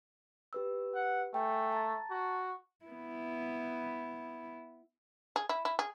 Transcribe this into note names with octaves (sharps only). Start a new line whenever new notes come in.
G4 B4 E6
F#5
A3 G5 G#5
A5 A#5 A6
F#4
B3 E4
G#4
E4
E4
G#4